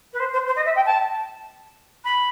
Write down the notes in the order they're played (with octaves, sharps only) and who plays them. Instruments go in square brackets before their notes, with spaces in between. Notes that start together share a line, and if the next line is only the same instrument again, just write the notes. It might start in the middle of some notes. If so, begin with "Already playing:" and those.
[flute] B4
C5
C5
C5
D#5
E5
G5
A5
B5